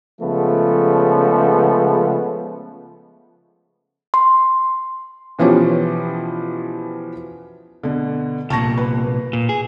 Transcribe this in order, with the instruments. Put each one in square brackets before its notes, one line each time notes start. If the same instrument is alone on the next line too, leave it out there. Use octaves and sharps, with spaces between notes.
[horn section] C#3 F3 G#3 A3 B3
[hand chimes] C6
[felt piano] B2 E3 F3 C#4 G4
B2 D3
[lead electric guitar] C2 A#2 [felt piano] A5 C#6 A#6
[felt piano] B4
[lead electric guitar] A#2
G#4